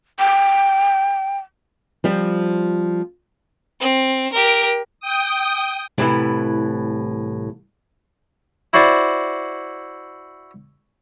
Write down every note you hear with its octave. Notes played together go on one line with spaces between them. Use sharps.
G5
F3 G3 C4
C4
G4 A#4
G5 D#6
C2 A2 E3 E4
E4 F#4 C5 D5